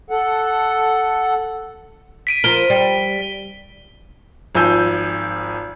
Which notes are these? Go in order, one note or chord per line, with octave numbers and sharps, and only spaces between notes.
A4 F#5
B6 D7 D#7
F3 A#4 G7
G3
G#1 F3 G#5 E6 G6